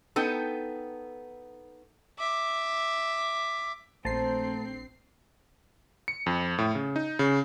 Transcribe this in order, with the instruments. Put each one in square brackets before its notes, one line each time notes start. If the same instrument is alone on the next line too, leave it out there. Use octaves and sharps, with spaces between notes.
[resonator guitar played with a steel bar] B3 D#4 G5 [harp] A4
[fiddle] E5 D6
[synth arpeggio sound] A#1 C7 [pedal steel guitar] A3 A5 A#5 [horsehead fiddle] C4 [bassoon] C5
[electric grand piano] C#7
F2
A2
C#3
D#4
C#3